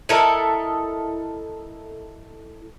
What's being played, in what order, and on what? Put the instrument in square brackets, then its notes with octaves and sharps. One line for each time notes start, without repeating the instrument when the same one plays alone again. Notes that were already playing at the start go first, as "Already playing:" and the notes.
[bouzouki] E4 A4 A#4 D#5